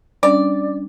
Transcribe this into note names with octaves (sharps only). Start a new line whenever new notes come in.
G3 C#4 D4 D5